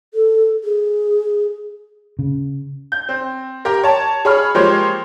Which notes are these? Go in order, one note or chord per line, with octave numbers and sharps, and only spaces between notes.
A4
G#4
C#3
G6
C4
G4 A#4
C#5 A5
G#4 C#5 B5 F6
F3 G#3 A#3 G4 C5 C#5